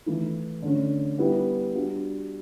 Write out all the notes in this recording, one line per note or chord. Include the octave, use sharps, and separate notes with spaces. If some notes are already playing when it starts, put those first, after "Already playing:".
E3 A3 E4
D3 A3 C#4
G3 B3 E4
G3 D4 F#4